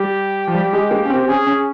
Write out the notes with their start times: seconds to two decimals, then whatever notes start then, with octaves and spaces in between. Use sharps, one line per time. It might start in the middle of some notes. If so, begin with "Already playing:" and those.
Already playing: G3 G4
0.47 F3
0.55 G3
0.73 G#3
0.91 A#3
1.05 C#4
1.10 C4
1.28 C#4 G#4
1.47 C#4